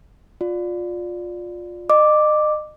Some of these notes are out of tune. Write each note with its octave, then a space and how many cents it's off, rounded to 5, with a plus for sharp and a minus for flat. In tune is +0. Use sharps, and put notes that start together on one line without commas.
F4 +20 D5 +0
D#5 -35 D6 +0